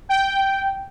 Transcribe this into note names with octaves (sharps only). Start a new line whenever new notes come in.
G5